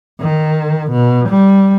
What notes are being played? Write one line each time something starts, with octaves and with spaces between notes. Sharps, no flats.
D#3
B2
G3